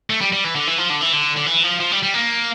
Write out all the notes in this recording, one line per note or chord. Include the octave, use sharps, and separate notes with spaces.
A3
G3
G3
E3
D3
E3
F3
D3
E3
D3
D3
E3
F3
F3
G3
G3
A#3